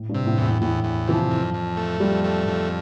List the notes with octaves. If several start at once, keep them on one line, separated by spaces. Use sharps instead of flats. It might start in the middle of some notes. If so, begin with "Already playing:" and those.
Already playing: A2
G2
C3
A2
E2
A2
E2 A2
E2
C3 E3
F3
F2
F2
A3
F2 G3
A3
F2